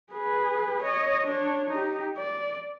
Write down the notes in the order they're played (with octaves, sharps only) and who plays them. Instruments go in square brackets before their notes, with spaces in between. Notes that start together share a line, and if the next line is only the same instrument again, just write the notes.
[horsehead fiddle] G#4 B4
C#5 D#5
D4 C#5
D#4 G4
D5